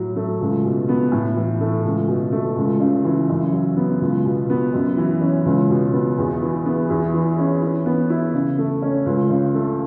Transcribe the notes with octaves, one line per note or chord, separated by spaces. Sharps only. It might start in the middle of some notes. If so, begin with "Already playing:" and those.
Already playing: A2 F#3
A3
C#2
B2
B3
A2
E3
A3
C#2
B2
A3
C#2
C#3
E3
F#2
F#3
B3
C#2
B2
B3
F#2
E3
C#4
C#2
B2
B3
E2
E3
B3
E2
E3
C#4
E3
B3
E4
C#3
A3
C#4
C#2
C#3
A3